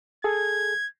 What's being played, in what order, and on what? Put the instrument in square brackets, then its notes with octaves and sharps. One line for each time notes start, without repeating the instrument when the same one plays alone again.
[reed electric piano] G#4 A4 [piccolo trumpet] G#6